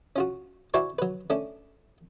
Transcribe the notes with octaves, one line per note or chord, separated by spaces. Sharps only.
C#4 F4 F#4
E4 F#4 C5 D5 G#5 C#6
F#3 B4
A3 C#4 D4